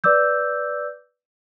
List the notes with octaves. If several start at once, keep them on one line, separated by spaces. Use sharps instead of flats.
B4 D5 D6 E6 G6